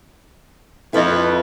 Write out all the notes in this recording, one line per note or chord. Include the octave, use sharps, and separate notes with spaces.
F2 E4 B4 D#5